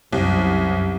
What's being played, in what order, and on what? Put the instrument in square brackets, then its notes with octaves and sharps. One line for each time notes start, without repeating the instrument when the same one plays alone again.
[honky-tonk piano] C2 [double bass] F#2